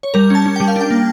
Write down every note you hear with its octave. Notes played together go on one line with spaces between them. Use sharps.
C#5
G3 A#4
C#4 A5
C#4
G3 G5
F5
D4 G5
A#3